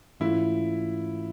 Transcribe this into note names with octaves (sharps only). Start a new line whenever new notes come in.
G#2 E3 A3 C#4 E4 F4